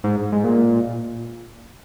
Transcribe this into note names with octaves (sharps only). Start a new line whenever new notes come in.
G#2
G#2
A#2